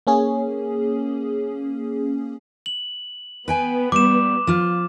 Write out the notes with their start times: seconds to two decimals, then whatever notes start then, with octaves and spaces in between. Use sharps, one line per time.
0.07 A#3 C#4 G#4
2.66 F#7
3.48 B3 B4 G5 G#5
3.92 G3 D6 E7
4.47 F3 F4